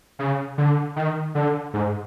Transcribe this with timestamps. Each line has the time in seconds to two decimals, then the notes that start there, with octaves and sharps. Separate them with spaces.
0.19 C#3
0.58 D3
0.96 D#3
1.35 D3
1.74 G#2